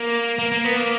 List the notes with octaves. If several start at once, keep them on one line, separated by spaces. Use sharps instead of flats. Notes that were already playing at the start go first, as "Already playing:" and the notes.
Already playing: A#3
A#3
A#3
B3
A#3